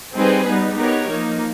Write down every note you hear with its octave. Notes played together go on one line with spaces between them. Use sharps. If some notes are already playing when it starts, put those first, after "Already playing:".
G3 C4 D#4 G#4 B4
G3 B3 D#4
B3 D#4 G4 A#4 C#5
F3 A#3 D#4